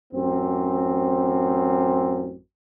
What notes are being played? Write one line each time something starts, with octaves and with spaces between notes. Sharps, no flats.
A1 F#2 C4